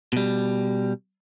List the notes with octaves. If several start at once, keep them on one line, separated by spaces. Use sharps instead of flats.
B2 G3